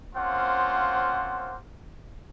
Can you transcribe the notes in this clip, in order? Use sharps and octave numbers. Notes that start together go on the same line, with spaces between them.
A#3 C4 C#4 F4 C5 F#5